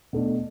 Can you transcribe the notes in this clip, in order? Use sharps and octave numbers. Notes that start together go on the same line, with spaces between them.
B2 A3 D4